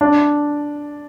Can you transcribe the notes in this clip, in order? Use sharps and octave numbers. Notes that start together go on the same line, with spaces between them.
D4